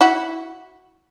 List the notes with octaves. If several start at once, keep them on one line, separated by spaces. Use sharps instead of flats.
E4 F#4